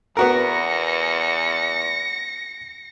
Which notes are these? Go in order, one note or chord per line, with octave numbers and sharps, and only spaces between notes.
E2 B3 F#4 A#4 A#6 C#7